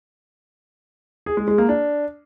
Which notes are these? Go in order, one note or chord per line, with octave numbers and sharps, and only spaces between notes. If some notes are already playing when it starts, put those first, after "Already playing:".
G#4
G#3
G#3
A#3
D4